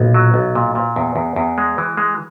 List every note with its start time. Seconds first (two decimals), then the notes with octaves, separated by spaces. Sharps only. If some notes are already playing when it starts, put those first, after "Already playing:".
Already playing: B1 A#2
0.14 F#3
0.34 B1
0.55 A#2
0.75 A#2
0.96 E2
1.16 E2
1.36 E2
1.58 G#3
1.78 E3
1.97 G#3